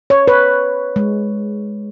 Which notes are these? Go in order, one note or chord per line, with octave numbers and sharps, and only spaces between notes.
C#5
B4
G#3